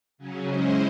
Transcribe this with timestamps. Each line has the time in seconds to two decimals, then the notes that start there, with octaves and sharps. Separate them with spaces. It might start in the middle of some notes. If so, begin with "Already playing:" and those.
0.18 C#3 F#3 C#4
0.47 G#3 C#4 E4 C5 D#5